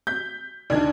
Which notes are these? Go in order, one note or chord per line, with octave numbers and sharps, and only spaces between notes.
G6 B6
D2 D#3 D4 D5 G#6